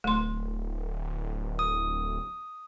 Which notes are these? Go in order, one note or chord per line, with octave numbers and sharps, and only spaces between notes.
D1 A3 C6
D#6